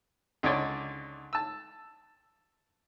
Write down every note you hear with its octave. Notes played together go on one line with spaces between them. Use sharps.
C#2 D3 D#4 C#5 D5 C6
A5 E6